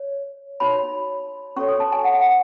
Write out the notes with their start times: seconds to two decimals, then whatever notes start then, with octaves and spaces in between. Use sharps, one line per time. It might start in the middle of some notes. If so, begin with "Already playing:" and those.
Already playing: C#5
0.60 D#4 F#4 C#5 B5
1.56 C#4 F#4 A4 C#5 C#6
1.68 D#6
1.80 A5
1.92 G#5
2.04 F#5
2.20 F#5